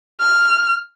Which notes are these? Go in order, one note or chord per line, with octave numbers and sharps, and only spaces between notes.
F6